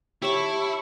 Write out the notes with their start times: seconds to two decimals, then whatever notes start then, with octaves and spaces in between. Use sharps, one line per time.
0.22 E4 G4 C#5 A5 C#6